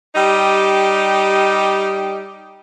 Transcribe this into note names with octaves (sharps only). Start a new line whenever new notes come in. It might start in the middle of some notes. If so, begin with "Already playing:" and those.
G3 D#4 G4